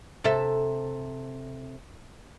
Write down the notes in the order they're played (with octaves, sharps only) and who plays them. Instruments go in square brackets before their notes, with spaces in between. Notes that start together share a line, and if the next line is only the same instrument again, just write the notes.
[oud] C3 A4 E5